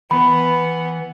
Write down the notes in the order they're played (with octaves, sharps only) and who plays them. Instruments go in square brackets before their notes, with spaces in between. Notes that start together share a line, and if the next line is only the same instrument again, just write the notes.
[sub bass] E3 [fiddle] B3 [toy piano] B5